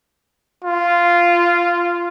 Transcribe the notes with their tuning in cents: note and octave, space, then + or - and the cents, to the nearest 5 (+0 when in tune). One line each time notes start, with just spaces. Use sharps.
F4 -10